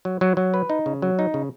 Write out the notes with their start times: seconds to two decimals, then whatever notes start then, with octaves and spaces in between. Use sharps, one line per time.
0.05 F#3
0.21 F#3
0.37 F#3
0.54 B4
0.70 D#4
0.86 C#3
1.02 F#3
1.19 D#4
1.34 C#3